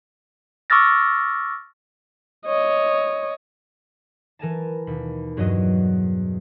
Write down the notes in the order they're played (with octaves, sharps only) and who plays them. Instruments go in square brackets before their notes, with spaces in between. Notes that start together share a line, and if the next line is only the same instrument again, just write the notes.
[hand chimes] C#6 D6 E6 F6 A6 A#6
[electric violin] C#5 D#5
[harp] E3 A#4 G#5 A5
D#2 B2 B5
E2 G2 F#3 B3 F#4 D#5